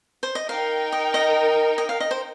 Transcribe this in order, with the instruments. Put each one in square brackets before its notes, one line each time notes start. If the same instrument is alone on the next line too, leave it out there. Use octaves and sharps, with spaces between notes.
[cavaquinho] C5
D#5
[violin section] D#4 A#4 G5 [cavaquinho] F5
[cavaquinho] D#5
D#5
D#5
F5
D#5
C5